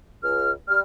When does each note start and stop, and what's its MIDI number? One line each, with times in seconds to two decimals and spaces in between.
0.23 0.51 37
0.23 0.51 89
0.69 0.80 55
0.69 0.80 89